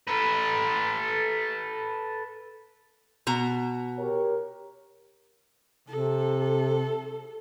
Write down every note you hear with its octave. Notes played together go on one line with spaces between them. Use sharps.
A4 B4
B2 A#5
G4 A#4 C#5
C3 A4